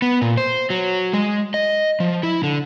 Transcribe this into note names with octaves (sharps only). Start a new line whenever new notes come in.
B3
A#2
C5
F#3
G#3
D#5
F3
E4
D3